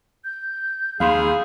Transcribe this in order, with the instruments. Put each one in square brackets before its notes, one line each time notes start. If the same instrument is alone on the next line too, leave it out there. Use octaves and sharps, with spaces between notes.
[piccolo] G6
[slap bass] D#2 [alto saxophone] G#4 [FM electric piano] F5 B5 C6